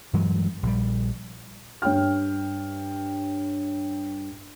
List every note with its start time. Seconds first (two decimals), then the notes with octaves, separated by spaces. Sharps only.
0.13 G2 E3 F#3 G#3
0.63 A#1 G3
1.82 G2 C#5 G5 F6